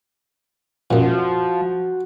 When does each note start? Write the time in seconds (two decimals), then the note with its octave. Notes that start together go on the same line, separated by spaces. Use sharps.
0.91 F#2 A#2 F3 F#4